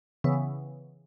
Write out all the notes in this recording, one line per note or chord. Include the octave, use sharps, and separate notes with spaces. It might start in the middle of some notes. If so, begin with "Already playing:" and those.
C#3 E3 B3